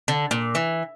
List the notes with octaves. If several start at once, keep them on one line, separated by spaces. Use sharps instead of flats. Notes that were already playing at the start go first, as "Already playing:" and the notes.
D3
A#2
E3